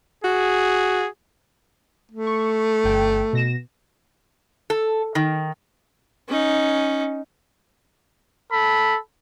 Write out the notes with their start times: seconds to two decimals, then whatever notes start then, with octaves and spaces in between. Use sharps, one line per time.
0.24 F#4 G#4
2.11 A3
2.27 C#6
2.84 G1 G5
3.33 B2 A#6 E7
4.70 A4
5.15 D#3
6.29 C#4 D#4
8.52 A4 B5